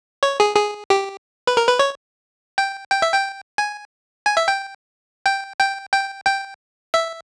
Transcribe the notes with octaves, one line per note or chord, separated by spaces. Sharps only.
C#5
G#4
G#4
G4
B4
A#4
B4
C#5
G5
G5
E5
G5
G#5
G#5
E5
G5
G5
G5
G5
G5
E5